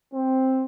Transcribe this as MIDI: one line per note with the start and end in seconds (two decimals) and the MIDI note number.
0.14 0.65 60